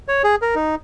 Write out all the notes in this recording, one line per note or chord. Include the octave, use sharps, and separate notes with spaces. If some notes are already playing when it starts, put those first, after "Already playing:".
C#5
G#4
A#4
D#4